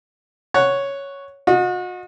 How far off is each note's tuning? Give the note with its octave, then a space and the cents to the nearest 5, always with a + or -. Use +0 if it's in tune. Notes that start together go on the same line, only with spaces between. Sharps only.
C#5 +0 F#5 +0
F#4 -40 D#5 -5